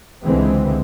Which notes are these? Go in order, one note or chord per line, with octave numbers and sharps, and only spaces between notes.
C#2 D3 E3 G#3 C4